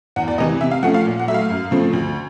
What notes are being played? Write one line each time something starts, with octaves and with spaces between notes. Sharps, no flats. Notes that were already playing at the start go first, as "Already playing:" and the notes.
E2 F#5
D5
C3 E3 D#5
C3 E5
F5
F3 A3 C#4 F#5
F5
A#2
F#5
F#3 A3 E5
F5
F#2
C#3 F3 A3 C4
D2